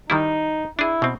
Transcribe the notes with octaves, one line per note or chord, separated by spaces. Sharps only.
D#3 G3 D#4 E4
D4 E4 G#4
B2 C4